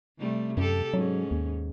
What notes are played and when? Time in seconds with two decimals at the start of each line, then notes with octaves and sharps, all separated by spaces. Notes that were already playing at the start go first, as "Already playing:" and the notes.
0.19 C3 G3 A3
0.57 F#2 G4 A4
0.94 G#2 F#3 C#4
1.31 D#2